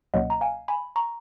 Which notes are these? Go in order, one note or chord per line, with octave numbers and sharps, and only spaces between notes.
C#2 B2 F#3 A#3 C#4 D#5 F#5
A#5
F5 G#5
G#5 B5
A#5 C#6